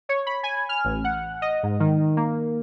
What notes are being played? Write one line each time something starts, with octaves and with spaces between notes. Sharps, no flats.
C#5
B5
G#5
F6
A1
F#5
D#5
G#2
D#3
A#3